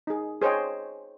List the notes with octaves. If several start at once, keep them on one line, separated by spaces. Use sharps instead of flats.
D#4 G#4
G#4 C5 C#5 D#5 G5